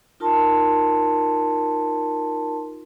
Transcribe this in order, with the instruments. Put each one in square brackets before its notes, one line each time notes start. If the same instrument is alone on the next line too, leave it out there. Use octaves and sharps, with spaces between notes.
[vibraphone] D#4 F4 A#4 A5 C6